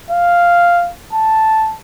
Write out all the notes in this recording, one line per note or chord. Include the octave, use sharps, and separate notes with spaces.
F5
A5